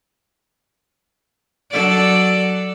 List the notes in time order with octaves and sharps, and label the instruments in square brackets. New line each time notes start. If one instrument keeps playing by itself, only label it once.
[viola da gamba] F#3 A4 D5